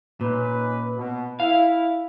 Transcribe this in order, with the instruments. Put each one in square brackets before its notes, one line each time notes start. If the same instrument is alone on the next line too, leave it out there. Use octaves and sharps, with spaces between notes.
[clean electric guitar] A#2 [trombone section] C#4 D#4 B4
[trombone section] B2
[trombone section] E4 [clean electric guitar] F5